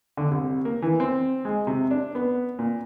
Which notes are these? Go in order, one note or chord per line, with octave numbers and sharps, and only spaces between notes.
D3
C2
A#3
E3
C4
G#3
C3
D4
B3
A#2